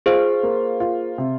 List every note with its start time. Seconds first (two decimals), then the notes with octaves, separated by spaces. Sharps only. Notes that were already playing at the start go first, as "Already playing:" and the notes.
0.06 F4 G#4 C5
0.43 A#3
0.80 F4
1.18 C3